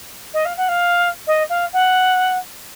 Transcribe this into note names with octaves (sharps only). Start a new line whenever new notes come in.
D#5
F5
F#5
F5
D#5
F5
F#5